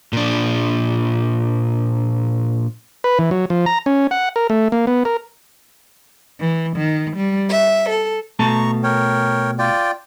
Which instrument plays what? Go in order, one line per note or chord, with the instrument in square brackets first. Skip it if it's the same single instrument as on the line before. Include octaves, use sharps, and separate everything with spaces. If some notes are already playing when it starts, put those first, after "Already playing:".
[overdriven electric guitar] A#2 D4
[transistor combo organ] B4
E3
F#3
F3
A#5
C#4
F#5
A#4
A3
A#3
B3
A#4
[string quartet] E3
D#3
G3
E5
A4
[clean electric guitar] B2 A3 A5 [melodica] A#5 C#6
[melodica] A#4 C#5 G5
F4 D5 G5